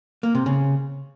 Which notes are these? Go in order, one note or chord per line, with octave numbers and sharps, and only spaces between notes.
A#3
C3
C#3